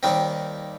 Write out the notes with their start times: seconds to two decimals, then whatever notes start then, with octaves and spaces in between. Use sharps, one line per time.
0.03 D#2 D#3 G3 C4